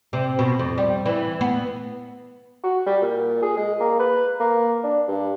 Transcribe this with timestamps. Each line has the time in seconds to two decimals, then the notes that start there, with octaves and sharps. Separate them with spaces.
0.13 C3
0.39 B2
0.59 F2
0.78 G3
1.06 E3
1.41 B3
2.64 F#4
2.86 G3
3.02 A#2
3.42 G#4
3.57 G#3
3.80 A#3
3.99 B4
4.40 A#3
4.84 D4
5.08 G2